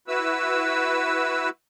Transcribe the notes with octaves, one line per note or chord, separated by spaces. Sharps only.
E4 F#4 B4 E6